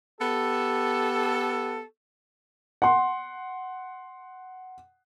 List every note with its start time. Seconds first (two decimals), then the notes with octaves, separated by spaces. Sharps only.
0.21 B3 G4 A4
2.82 F#5 C6